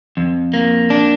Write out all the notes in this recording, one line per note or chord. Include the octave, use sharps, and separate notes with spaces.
F2
A#3
D4